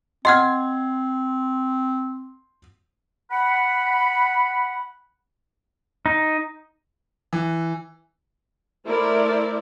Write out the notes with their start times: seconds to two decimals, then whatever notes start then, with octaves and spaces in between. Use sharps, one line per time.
0.25 C4 D#5 F#5 C6 F6 G#6
3.31 F#5 B5
6.06 D#4
7.33 E3
8.86 A3 E4 A#4 C5 D5